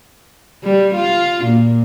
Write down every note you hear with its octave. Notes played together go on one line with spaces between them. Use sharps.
G3
F4
A#2